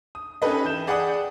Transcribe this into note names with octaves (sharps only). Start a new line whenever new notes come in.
D#6
C#4 D#4 G4 A4 B4 D#5
E3 G6 E7
G#4 D5 F#5 G5 B5 D#6